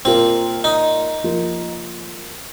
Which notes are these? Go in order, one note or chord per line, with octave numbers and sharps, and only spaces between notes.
A#2 A#3 C4 F4 A#4
D#4
F3 A#3 F4 A#4